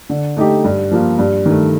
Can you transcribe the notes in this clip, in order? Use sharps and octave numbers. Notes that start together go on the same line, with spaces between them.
D3
A3 D#4 G4
G2
F3 A#3 F4
G2
D#3 A3